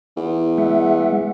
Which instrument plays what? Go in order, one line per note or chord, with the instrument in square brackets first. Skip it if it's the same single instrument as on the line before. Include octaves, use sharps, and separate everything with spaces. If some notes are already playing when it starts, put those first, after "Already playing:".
[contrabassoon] E2
[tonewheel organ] G#3 E5 F#5